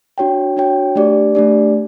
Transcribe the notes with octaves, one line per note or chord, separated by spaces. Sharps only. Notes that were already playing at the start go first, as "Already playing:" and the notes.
D4 F#4 C#5 G5
D4 F#4 C#5 G5
A3 D4 G4 D5
A3 D4 G4 D5